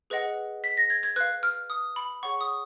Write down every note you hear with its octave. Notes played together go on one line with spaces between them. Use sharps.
G#4 B4 D#5 F#5
B6
A#6
G#6
G#6
B4 F5 F#6
F6
D#6
B5
G#4 C#5 F#5 C#6
D#6